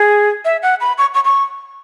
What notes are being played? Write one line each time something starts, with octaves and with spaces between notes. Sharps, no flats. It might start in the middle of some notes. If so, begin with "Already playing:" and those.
Already playing: G#4
E5
F#5
B5
C#6
C#6
C#6